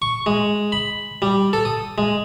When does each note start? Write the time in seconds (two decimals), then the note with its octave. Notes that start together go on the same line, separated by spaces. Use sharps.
0.02 C#6
0.26 G#3
0.72 B5
1.22 G3
1.53 A4
1.65 D#6
1.98 G#3